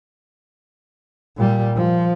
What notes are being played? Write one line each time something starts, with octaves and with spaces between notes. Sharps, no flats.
A#2 G3
F3